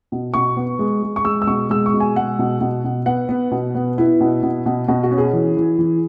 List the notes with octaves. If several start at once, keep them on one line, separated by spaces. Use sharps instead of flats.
B2
B2 C#6
B3
G#3
G#3
C#6
G#3 E6
E6
B2 C#6
G#3 E6
C#6
B2
G#5
G#3 F#5
B2
B2
B2
B3 F#5
B3
B2
B3
B3 E4
B2
B2
B2
B2 F#4
F#4
C#4
G#4
E3
E3
E3